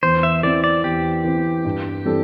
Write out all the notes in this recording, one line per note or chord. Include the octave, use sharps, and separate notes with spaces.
E2 C5
E5
E3 C4 D5
D5
E2 G4
E3 C4
G2
E3 G3 C4 A4